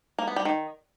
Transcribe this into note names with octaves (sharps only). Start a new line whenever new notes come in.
A#3
B3
G3
D#3